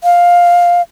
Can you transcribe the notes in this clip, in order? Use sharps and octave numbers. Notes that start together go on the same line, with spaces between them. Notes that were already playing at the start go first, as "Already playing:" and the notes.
F5